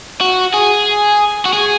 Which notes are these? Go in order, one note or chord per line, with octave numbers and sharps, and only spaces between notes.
F#4
G#4
F#4
G#4